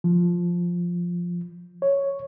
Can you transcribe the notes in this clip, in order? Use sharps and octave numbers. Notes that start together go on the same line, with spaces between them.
F3
C#5